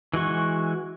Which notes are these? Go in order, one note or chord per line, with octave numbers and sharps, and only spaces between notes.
E3 G#3 F#4 C#6